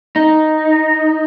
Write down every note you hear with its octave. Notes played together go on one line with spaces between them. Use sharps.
D#4